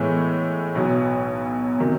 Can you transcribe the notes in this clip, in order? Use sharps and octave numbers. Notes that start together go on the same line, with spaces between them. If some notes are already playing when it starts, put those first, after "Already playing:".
Already playing: A2 E3 G#3 B3
B1 B2 F#3 B3
C3 D#3 F#3